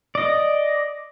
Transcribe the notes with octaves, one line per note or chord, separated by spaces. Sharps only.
D5 D#5